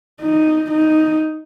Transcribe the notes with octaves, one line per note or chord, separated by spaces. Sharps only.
D#4
D#4